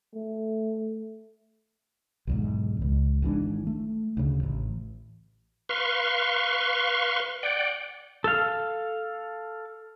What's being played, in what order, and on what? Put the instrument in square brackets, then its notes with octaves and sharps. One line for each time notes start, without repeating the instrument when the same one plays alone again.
[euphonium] A3
[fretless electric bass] B1 E2 G#2
C#2
G#1 G#2 E3 D4
A3
D2 C#3
A1
[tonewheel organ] B4 F5 C6 C#6
D5 F#5 G5
[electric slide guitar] A4 F5